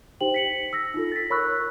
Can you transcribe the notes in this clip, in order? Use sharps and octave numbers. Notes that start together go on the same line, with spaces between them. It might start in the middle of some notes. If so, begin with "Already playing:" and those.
D#4 G4 C5 G5 F#7
B6 C#7 F#7
E6 A#6
D#4 F4 A4
A6 B6
A#4 C#5 B5 C#6 E6 F#6